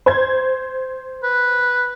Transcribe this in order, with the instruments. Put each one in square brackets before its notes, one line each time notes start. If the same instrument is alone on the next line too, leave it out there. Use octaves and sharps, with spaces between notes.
[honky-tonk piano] C5 G#6
[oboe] B4